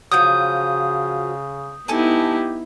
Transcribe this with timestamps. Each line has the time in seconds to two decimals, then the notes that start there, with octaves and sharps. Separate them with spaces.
0.12 C#3 F3 F#3 D#6 G6
1.88 B3 D#4 E4 G4 A4 G#5 A5